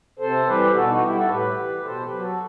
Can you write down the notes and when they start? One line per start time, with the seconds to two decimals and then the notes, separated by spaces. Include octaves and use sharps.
0.19 C3 A4 C5
0.47 E3 G3 G4 B4
0.74 B2 F#4 A4
0.88 D#4 F#4
1.02 G3 E4 G4
1.15 F#4 A4
1.29 A2 G4 B4
1.57 E3 G3
1.84 B2 A4 C5
2.02 G4 B4
2.11 F#3
2.20 F#4 A4